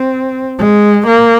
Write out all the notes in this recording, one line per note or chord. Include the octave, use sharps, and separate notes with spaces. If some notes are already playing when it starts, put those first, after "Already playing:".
Already playing: C4
G#3
A#3